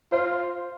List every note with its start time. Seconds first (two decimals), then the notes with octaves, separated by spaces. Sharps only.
0.12 F4 C5